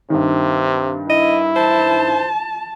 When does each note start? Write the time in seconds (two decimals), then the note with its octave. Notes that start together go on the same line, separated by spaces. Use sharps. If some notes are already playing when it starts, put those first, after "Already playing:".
0.10 G2 C3 D#3
1.09 E4 D#5
1.56 C5 A5